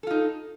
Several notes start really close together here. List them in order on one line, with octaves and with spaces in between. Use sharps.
A4 F4 D#4